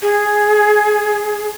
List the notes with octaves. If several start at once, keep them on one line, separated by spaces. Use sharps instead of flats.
G#4